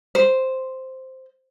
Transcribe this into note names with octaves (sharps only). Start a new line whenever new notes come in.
C5